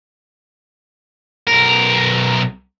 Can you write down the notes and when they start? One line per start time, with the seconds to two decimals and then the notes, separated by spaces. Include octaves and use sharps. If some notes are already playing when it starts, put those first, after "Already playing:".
1.47 B1 A#4